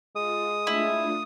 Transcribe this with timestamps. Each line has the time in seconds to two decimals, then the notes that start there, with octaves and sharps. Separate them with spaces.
0.16 G#3 F4 D#6
0.67 A3 D4 E4 F4